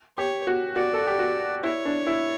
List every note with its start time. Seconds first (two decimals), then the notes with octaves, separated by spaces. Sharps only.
0.18 G4 C#5
0.47 F#4
0.76 F#4 D5
0.93 A4
1.07 G4
1.19 F#4
1.63 E4 C#5
1.85 D4
2.07 E4